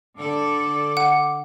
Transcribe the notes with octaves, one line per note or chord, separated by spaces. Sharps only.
D3 A4 D5 D6
F#5